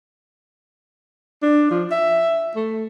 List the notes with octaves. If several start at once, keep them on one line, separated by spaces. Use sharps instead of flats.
D4
F3
E5
A3